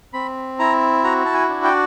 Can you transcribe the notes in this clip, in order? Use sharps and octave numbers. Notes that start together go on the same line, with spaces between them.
C4 B5
E4 A#5
F#4 A#5
A5
G#5
D4
G5